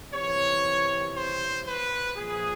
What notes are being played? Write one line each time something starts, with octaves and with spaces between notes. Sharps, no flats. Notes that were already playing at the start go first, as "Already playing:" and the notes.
C3 E3 C#5
C5
B4
A#2 F3 G#4